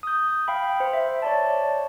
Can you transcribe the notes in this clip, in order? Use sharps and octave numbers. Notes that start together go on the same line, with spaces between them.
D#6 G6
F5 G5 B5
C5
E5
C#5 D5 A5